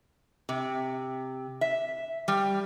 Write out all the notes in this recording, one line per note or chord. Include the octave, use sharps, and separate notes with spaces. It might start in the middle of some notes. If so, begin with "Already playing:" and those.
C3
E5
G3